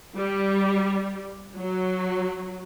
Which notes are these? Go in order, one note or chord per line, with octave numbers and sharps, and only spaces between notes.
G3
F#3